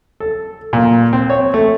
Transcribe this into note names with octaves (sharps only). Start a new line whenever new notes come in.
A4
A#2
C4
C#5
A3